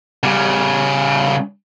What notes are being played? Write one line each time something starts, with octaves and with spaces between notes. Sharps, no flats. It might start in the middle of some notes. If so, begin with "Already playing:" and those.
C#3 G3